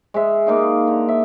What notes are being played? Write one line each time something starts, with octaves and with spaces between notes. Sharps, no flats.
G#3 E5
A#3 D#4 F4
D3
E5